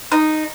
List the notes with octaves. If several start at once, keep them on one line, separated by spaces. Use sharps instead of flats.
D#4